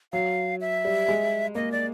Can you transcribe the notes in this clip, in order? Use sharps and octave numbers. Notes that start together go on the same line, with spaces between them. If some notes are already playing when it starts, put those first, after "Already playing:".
F#3 F5
E5
G3
G#3
A#3 D#5
D5